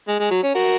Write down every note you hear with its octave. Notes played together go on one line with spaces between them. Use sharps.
G#3
G#3
F#3
C#4
F#4 A#4